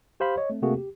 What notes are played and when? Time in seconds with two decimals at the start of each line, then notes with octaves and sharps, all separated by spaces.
0.20 G4 C5 F5 B5
0.37 C#5 D#5
0.50 A3 C4
0.62 C3 A3 A#3 C4 F#4 G#4
0.77 G4